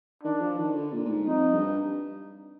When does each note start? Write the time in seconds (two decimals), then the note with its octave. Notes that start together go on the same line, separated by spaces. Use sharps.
0.23 D#3 D4
0.34 D#3
0.41 F3
0.58 D#3
0.75 D3
0.93 A#2
1.05 A#2
1.10 G#2
1.27 F2 D#4
1.54 G2